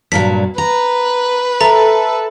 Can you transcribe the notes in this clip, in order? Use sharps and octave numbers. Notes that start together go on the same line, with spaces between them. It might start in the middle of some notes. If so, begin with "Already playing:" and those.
G2 A#2 F#3 B6
B4 A#5
A4 E5 A#5